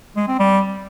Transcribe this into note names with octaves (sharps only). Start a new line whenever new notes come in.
G#3
C4
G3